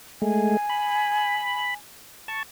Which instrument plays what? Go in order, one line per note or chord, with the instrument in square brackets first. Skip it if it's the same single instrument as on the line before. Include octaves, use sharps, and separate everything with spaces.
[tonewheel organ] G#3 A3 [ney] G#5
[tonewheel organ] B5
A5 C#6